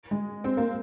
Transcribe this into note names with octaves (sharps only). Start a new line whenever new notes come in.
G#3
C4
A#3